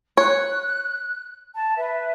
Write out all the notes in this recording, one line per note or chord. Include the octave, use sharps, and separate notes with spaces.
C#5 F#6
A5
B4 E5